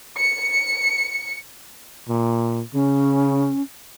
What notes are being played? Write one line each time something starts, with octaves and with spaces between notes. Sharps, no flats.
C#7
A#2
C#3 C#4